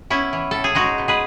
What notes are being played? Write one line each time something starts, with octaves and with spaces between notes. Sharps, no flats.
B3 C#4 E4
E3
A2 A4
G#4
G#3 D#4 F#4
B2
G#4 B4